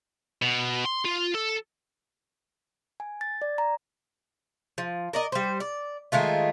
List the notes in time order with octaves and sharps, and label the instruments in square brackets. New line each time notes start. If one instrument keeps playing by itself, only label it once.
[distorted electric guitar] B2
C6
F4
A4
[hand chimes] G#5
A6
D5
A#5
[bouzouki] F3
A#4 D5 D#5
G3 C5
D5
D#3 G#3 A3 F4